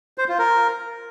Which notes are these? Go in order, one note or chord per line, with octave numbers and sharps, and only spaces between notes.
C5
F4
A#4